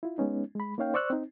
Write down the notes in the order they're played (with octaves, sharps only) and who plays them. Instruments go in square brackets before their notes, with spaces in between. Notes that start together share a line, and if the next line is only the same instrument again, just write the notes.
[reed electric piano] E4 F4
G#3 B3 C#4 D#4
G#3 B5
A#3 C#4 D#4 C#5 F5 G5
C5 D5 C#6 E6 F#6
C4 D#4